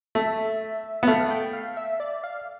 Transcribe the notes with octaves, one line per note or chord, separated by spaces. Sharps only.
A3 E5
B3
A3 F5
G5
F5
E5
D5
F5